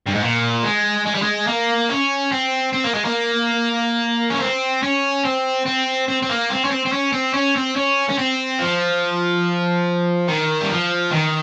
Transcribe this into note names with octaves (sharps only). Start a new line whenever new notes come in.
G2
G#2
A#2
G#3
G#3
G3
G#3
A#3
C#4
C4
C4
A#3
G#3
A#3
C#4
C4
C#4
C4
C4
C4
C4
A#3
C4
C#4
C4
C4
C#4
C4
C#4
C4
C#4
C#4
C4
F3
D#3
G3
F3
D#3